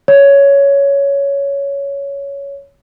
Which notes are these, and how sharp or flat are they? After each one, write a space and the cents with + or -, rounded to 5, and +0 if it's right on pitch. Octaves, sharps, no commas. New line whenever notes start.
C#5 +10